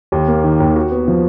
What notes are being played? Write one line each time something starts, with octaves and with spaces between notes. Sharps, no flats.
D#2
A#3
D#3
D#2
F#4
B3
F3